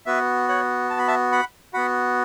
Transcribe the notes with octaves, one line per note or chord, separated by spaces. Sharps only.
B3 F#4 B4 E5
C#5 F#5
A5
B5
E5 A5
F#5 B5
B3 F#4 F#5 B5